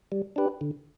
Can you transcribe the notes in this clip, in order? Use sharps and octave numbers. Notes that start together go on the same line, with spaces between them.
G3
D4 G4 B4
D3